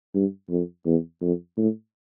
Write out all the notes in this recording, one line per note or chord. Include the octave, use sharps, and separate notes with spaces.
G2
F2
E2
F2
A2